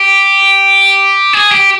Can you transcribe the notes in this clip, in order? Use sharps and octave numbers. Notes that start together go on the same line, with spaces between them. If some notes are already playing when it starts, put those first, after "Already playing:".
Already playing: G4
G#4
G4